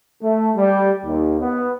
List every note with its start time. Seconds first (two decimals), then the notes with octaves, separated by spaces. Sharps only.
0.22 A3
0.56 G3
1.05 D#2
1.40 B3